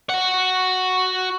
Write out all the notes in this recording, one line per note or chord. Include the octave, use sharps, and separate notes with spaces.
F#4 F#5